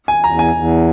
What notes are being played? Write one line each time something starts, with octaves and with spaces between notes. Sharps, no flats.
G#5
E2 A#5
G#5
E2